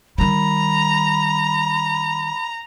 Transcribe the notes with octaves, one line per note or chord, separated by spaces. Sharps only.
D#3 G3 A#5 B5